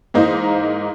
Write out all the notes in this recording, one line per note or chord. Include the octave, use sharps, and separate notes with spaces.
G#2 E3 A#3 D#4 C5 D#5